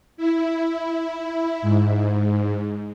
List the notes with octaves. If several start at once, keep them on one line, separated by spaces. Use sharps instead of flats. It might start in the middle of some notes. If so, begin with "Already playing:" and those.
E4
G#2